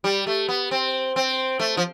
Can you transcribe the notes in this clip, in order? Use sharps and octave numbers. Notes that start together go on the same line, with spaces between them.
G3
A3
B3
C4
C4
A3
F3